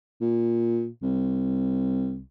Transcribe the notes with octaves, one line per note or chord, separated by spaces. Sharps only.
A#2
C2